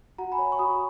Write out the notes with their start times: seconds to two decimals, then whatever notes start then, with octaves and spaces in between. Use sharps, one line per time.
0.18 F#4 F#5 A#5
0.32 G#5 B5
0.39 C#5
0.52 C#6
0.59 F#4 B5 D#6